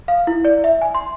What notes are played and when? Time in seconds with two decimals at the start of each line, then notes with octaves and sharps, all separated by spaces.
0.08 F5
0.27 E4
0.45 D5
0.64 E5
0.81 G#5
0.95 C6